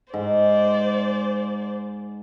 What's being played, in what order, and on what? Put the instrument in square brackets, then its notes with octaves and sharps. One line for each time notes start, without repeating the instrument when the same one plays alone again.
[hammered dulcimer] G#2 [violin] C5 D5